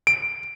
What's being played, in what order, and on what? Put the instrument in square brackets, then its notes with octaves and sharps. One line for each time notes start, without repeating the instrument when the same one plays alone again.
[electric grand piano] D7